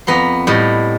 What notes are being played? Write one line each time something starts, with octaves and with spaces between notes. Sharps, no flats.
F2 B3 A#5 C6
A2 G3 D#5